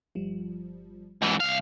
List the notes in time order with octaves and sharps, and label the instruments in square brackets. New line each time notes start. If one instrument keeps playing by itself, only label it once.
[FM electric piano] G1 F3 G3
[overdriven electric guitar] G#2 E3
C2 F5